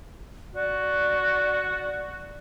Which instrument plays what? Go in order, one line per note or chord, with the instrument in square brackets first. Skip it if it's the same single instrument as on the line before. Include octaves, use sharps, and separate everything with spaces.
[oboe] F#4 [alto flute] D5